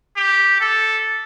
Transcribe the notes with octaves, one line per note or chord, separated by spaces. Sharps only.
G4
A4